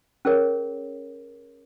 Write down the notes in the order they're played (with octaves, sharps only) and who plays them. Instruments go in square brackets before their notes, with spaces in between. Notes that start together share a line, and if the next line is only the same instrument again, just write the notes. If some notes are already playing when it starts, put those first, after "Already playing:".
[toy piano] C#4 G#4 A#4 C#5